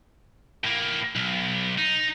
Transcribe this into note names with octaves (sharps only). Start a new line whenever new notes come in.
A2 A#3
B1
D#4